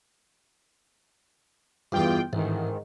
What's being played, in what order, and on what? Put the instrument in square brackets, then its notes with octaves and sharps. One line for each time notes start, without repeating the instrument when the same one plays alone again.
[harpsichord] E2 G2 [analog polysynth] F4 G5
[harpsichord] A1 [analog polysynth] G#2 D#3